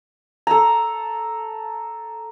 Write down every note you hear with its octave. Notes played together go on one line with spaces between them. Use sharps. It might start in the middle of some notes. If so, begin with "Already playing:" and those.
A4 A#5